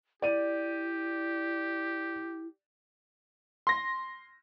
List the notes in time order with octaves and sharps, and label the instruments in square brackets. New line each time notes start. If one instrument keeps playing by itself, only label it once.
[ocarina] E4 [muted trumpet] G4 [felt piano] D5 D#7
[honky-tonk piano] C6 A#6